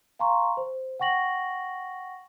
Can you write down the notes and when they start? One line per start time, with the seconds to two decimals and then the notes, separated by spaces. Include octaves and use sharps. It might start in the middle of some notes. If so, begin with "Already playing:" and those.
0.19 F5 G#5 A#5 C6 C#6
0.57 C5
1.00 F#5 G5 C#6 A#6 F#7